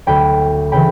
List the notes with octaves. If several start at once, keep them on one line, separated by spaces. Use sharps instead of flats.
D2 D3 F#3 G5 B5
C#3 E3 G5 B5